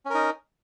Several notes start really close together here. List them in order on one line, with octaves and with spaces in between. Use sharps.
C#4 A#4 D#4